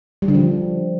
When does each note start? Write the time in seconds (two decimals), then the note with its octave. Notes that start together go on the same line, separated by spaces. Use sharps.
0.22 G3
0.28 D3
0.34 F3
0.41 D3